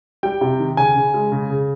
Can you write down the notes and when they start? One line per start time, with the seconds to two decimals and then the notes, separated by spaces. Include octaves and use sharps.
0.23 G3 G5
0.41 C3
0.59 D#3
0.77 C#3 G#5
0.96 C#3
1.14 G#3
1.32 C#3
1.50 C#3